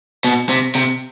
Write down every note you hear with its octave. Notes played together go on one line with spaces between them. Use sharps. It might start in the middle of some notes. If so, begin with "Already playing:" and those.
B2
C3
C3